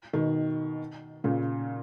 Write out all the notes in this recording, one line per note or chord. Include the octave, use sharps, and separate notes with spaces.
B2 D#3
A#2 C#3